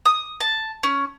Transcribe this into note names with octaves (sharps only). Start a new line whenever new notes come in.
D#6
A5
C#4